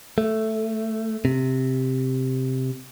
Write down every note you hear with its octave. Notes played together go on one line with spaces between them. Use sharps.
A3
C3